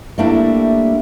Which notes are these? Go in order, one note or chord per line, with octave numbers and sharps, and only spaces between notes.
G3 A3 A#3 D4 E4